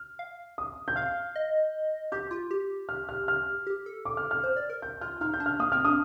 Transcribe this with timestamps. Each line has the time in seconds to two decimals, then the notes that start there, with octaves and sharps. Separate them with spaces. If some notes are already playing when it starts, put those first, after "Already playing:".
Already playing: F6
0.19 F5
0.58 D#6
0.88 G6
0.96 F5 F6
1.36 D#5
2.12 G4 G6
2.31 F4
2.51 G4
2.89 F6
3.09 F6
3.28 F6
3.67 G4
3.86 A4
4.05 D6
4.17 F6
4.31 F6
4.43 C5
4.56 D5
4.70 A#4
4.82 G6
5.01 F4 F6
5.21 D#4 F6
5.34 G6
5.40 D4
5.46 F6
5.59 A#3 D#6
5.72 C4 F6
5.85 D4 D#6